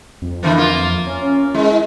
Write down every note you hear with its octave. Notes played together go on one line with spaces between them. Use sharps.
F2
D3 E3 B3
A#3 F4
C#4
G#3 E4